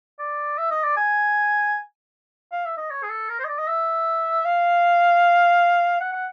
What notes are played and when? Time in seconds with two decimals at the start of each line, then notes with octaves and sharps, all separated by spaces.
0.19 D5
0.58 E5
0.71 D#5
0.84 D5
0.97 G#5
2.52 F5
2.65 E5
2.77 D#5
2.90 C#5
3.03 G#4
3.10 A4
3.29 A#4
3.39 C5
3.44 D#5
3.48 D5
3.59 D#5
3.67 E5
4.45 F5
6.00 F#5
6.12 F#5